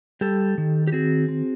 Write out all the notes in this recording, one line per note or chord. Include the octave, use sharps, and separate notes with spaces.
G3 G4 A4
D#3
G4
C4 F#4 G#4
C4